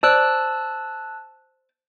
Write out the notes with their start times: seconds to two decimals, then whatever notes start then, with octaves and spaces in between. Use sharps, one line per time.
0.03 C5 D5 A5 E6 F#6